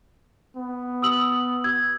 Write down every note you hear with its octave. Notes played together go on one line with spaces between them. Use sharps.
B3
D#6 E6 F#7
E6 G#6